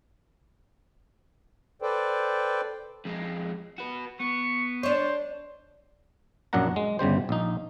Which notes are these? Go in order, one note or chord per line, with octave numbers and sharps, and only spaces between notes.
A4 B4 C5 D5 G5
F2 G#3
F#4 B4
B3 C#6
D4 C5 C#5
A#1 F#2 F#3 D4 F#5 A#5
G#3
G1 C#3 G3 C5
A#1 D#4